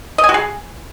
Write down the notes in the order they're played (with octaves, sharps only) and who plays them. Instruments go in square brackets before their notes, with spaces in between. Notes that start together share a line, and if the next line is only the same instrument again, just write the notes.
[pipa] D#5
G#5
F#4
G#4